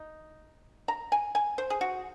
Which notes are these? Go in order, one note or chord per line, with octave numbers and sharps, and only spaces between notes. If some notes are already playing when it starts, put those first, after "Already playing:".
Already playing: D#4
A#5
G#5
G#5
C5
G#4
F#4